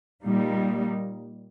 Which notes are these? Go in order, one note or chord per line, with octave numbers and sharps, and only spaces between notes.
A#2 G3 A#3 D#4